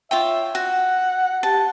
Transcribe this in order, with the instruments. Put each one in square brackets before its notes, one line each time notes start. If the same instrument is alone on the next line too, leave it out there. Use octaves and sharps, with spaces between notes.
[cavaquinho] F4 C#5 G5 [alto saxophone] E5
[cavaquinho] F#4 [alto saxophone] F#5
[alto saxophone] G4 [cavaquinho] A5